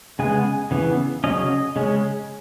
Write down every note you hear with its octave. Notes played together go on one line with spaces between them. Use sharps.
C#3 G#3 B3 G#5
C#3 E3 B3
C#3 F#3 C#4 D#5
C#3 G#3 C#4